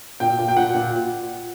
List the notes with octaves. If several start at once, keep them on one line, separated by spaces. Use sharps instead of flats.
A#2 G5
A#2
G5
A#2 F#5
A#2